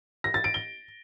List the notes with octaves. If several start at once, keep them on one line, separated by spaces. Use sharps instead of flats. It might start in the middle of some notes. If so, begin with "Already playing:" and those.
A#6
A6
D7
G7